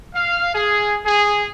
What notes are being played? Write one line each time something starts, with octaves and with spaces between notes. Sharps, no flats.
F5
G#4
G#4